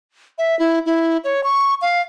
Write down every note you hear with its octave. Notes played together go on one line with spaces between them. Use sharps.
E5
E4
E4
C#5
C#6
F5